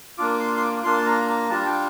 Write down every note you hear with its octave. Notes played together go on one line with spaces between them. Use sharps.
A#3 D4 F4 D6
C6
C6
D6
D6
A#3 D4 F4 C6
A5
A#5
A#5
G3 D4 F4 A5
G5